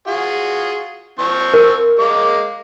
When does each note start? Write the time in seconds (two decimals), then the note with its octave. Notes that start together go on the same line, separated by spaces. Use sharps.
0.07 F4 F#4 G#4
1.19 F3 C4 C#6
1.54 A#4
1.99 G#3 A#3 D6